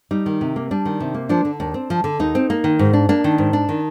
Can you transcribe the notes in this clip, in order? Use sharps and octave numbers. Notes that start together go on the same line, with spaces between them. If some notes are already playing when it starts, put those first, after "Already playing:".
G3 D#4
D#3
C3
A#3
G3 D4
D#3
C3
A#3
F3 D4
D3
D#2 D4
C4
F3
D3
D#2 D#4
C4
A#3
D#3
G#2
D4
A#3 D4
D#3
G#2
D4
D#3